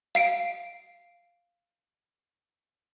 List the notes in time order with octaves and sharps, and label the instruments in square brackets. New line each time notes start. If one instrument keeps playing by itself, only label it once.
[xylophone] F5 C7 D7